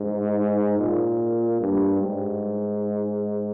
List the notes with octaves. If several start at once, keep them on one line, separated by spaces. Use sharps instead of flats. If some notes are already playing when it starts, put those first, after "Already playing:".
Already playing: G#2
A#2
G2
G#2